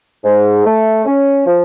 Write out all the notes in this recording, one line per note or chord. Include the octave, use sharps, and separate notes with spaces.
G#2
A3
C#4
F3